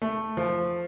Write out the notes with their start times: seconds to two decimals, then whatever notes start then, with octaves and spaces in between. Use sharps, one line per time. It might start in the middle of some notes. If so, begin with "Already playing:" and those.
0.02 A3
0.37 F3